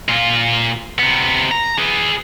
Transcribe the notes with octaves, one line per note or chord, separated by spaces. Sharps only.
A#2 F4
C3 B3
A#5
G#4 B4